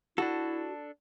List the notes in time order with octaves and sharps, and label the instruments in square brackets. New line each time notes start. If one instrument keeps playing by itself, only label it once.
[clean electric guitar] D4 A4 [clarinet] E4 [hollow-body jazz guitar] F#4